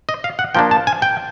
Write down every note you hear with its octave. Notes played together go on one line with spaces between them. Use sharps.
D#5
F5
F#5
F3 A#3 D4 G5
A5
G#5
G5